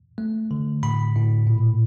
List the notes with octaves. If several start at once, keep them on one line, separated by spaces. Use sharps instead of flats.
A3
D3
A2 B5
A2
A#2